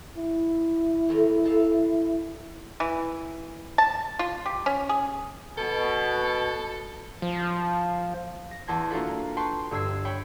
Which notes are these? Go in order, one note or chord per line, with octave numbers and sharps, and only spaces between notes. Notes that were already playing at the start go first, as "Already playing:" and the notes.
E4
E2 A3 A#4
D#4 A4 F5
E3
A5
F4
G4
C#4
G#4
B2 A4
F3
A#6
E2 B3 A5 C6 G#6
A#3 D4 F4 F#4 A4 B4
B4 G5 A5 C6 C#6
G1 G2 E6 G#6 C7
C#5 G5 B5